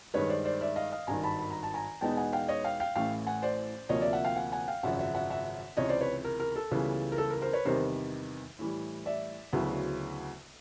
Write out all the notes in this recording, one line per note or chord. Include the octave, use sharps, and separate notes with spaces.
G2 D#3 G#3 B4 C#5
C5 D5
C5 D5
D5 E5
D#5 F5
D#5 F5
G#1 G2 D#3 G#5 A#5
A5 B5
B5
A#5
A5
G#5 A#5
E2 B2 G#3 B3 D#4 G5 A5
F#5 G#5
F5 G5
C#5 D#5
F5 G5
F5 G5
A1 A2 E3 A3 F5 G5
F#5 G#5
C5 D5
D2 C3 F3 A#3 C#5 D#5
D5 E5
E5 F#5
F5 G5
F#5 G#5
F#5 G#5
F5 G5
G#1 F#2 C#3 F3 E5 F#5
E5 F#5
E5 F#5
E5 F#5
C#2 C3 E3 C#5 D#5
C5 D5
B4 C#5
A#4
A#4
A4
C#2 C#3 E3 G3 B3
A#4
A4
A#4
A#4 C5
B4 C#5
E2 C3 D#3 G3 B3 A#4 C5
A2 E3 G3
D5 E5
D2 C#3 F#3 B3 E4